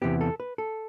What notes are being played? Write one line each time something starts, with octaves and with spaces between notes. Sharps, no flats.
E2 C3 E3 B3 G4
A4
B4
A4